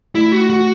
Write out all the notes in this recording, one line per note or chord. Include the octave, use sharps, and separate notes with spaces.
A3 E4
A3 F#4
F#4 F#5